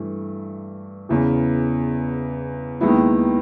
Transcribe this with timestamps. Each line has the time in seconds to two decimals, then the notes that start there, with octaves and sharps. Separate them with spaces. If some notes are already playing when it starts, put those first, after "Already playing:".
Already playing: G2 E3 A3
1.09 E2 C#3 E3
2.81 D#2 D#3 G#3 B3 E4